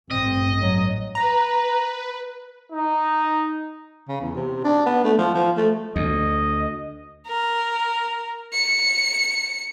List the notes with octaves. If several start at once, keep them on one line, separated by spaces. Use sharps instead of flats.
A1 G2 C4 D#5
F#3
B4 A#5
D#4
C#3
E2
C3
D4
B3
A3
F3
F3
A3
D2 D#5
A#4
C#7